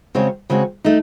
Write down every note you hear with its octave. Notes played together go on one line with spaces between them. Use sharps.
C#3 G#3 C4 F#4 C#5
C#3 G#3 C4 F#4 C#5
A3 D#4